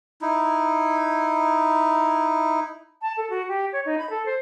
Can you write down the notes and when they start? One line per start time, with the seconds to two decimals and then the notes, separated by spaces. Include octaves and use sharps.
0.22 D#4 E4
3.01 A5
3.17 A4
3.30 F#4
3.48 G4
3.72 C#5
3.85 D#4
3.98 B5
4.10 A4
4.25 C5